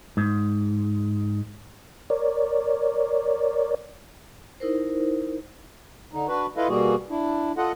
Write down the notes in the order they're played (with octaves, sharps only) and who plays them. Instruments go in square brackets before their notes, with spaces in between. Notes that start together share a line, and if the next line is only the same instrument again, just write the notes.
[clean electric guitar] G#2
[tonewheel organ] A#4 C#5 D5
[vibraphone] D#4 E4 A#4 C5
[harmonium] D3 D#4
D4 F#4 B4
E4 F4 A4 B4 D#5 F5
B2 G3 A#3 F#4 G#4
D4 E4
F4 A4 D#5 F#5